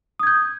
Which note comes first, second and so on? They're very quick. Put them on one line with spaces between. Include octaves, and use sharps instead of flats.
D#6 G#6 G6